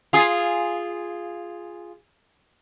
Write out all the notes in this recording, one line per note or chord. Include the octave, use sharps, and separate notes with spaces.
F4 G#4